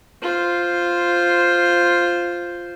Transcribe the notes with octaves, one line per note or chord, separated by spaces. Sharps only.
F4 C5